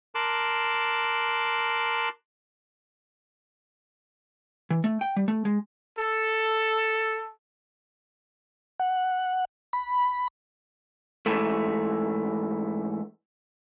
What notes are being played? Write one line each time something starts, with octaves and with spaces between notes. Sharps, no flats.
A#4 A5 C6 D6 F#6
E3
A3
G5
G3
A3
G#3
A4
F#5
B5
G#2 E3 A3